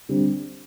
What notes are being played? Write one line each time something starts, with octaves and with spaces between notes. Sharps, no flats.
D3 G3 C4